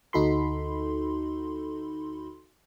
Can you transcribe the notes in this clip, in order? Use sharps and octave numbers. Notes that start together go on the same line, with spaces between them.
D2 D#4 F#4 A4 B5 C6